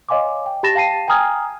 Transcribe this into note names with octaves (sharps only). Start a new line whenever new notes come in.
C#5 D#5 F5 G#5 C6 D6
G5
G4 A5 B5 A6 A#6 E7
F5 G5 A5 C7 D#7
G5 G#5 A#5 D#6 F6 G#6